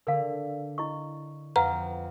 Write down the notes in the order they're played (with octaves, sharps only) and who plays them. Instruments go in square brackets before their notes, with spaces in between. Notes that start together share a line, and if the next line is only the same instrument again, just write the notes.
[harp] D3 [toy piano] A#4 F5
[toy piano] E4 D#5 C#6
[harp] F2 [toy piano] B4 F5 F#5 [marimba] A#5